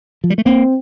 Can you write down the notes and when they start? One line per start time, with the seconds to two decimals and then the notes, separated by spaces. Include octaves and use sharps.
0.24 F3
0.30 G3
0.38 A3
0.45 A#3 C4